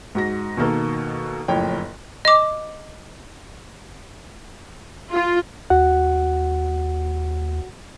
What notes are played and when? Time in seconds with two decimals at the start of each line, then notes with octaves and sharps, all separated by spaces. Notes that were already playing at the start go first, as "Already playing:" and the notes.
0.15 G#2 F#4 A#6
0.57 B2 D#3 A#3 A4
1.48 F#1 F2 A2 C#5 G5
2.25 D#5 D6
5.13 F4
5.70 D#2 F#4 F#5